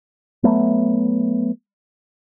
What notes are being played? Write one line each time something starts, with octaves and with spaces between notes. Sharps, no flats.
F#3 A3 B3